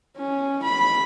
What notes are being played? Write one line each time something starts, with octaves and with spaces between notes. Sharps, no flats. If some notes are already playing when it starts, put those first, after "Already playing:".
C#4
B5